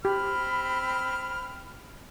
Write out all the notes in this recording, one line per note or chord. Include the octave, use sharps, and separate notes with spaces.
C4 G4 B5 F6